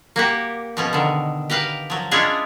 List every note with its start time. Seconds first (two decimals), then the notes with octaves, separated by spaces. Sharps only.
0.16 A#3 F#4 G4
0.77 B2 F3 C#4
0.93 D3 D#3
1.50 G4 A#4 B4 F5
1.90 F3 F#3
2.11 G#3 C#4 D4 E4 F4 G#4